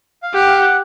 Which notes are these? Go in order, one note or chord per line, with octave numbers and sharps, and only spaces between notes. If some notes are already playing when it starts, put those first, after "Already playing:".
F5
G4 F#5
F5
F#5